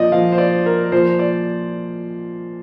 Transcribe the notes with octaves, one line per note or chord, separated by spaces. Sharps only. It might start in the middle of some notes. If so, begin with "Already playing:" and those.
Already playing: A#2 F3 D5 D#5
A#2 F3 F5
C5
D5
A#4
A#2 F3 C5
D5